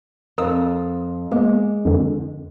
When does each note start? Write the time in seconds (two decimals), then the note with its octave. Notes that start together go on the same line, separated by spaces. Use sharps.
0.38 F2 A#4 D#6 E6
1.31 G#3 A#3 B3
1.85 F2 D3